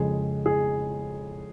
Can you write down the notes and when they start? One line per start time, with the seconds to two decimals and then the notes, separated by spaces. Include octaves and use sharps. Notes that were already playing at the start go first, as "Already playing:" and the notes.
Already playing: F2 C#3 G#3 G#4
0.46 G#4